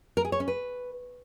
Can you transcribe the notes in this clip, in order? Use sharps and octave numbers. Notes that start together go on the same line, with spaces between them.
A#4
G#4
C#5
C#4
B4